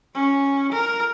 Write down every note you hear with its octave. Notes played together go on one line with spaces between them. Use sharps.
C#4
A#4